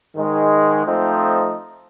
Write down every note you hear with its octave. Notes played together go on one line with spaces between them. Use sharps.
G#2 D#3 G#3
F3 A3 C4 D#4